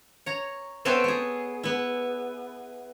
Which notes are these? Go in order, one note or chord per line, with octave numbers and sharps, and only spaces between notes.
C#5 A#5
B3 C4 A4 C#5 E5 G5
B3 G#4
B3 E4